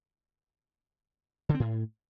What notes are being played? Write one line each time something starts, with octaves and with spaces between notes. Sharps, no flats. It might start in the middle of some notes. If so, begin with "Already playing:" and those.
D3
C4
A2